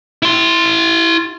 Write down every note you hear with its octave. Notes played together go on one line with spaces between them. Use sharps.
E4 C6